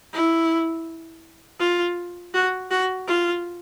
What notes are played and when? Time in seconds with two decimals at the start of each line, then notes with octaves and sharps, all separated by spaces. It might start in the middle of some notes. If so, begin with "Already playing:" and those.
0.13 E4
1.60 F4
2.34 F#4
2.70 F#4
3.07 F4